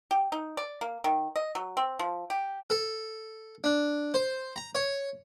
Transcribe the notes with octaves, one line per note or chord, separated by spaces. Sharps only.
G4
D#4
D5
A#3
D#3
D#5
F#3
C4
F3
G4
A4
D4
C5
A#5
C#5